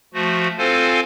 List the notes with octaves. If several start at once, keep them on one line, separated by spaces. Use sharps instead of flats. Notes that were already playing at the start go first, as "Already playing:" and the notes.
F3 A3 F#4
C4 F4 A4 C5 F5 G#5